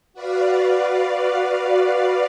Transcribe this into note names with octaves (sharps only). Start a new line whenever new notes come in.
F#4 B4 D5 F5